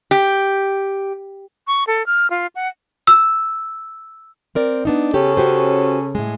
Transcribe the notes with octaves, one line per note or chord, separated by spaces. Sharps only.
G4
C#6
A4
F6
F4
F#5
E6
C4 A#4 D5
B3 D4 D#4
C#3 C#4 G4 A4
F#4 G4 C5
A2 G#3